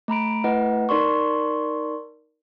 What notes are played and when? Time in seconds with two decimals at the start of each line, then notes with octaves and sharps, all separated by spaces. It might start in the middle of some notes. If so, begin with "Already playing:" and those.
0.08 A3 A#5 B5 D7
0.44 A3 E4 B4 D#5 F#5
0.89 D#4 A#4 D5 C6 C#6